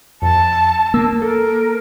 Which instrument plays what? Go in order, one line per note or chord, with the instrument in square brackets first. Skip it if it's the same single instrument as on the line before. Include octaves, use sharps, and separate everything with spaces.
[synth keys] F2 [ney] A5
[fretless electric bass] A#3 [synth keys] E6
[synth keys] A4 [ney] A#4